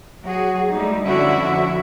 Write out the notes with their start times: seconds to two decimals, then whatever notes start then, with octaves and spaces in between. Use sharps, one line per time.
0.23 F#3 F#4 G#4
0.72 G3 A3 D#4
1.06 F2 D3 C#4 E4 F#4 E5